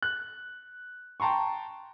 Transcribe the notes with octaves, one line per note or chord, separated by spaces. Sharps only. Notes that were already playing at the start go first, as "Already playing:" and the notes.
F#6
G5 A5 A#5 C6 C#6